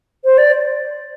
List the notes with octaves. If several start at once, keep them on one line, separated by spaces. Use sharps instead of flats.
C5
D5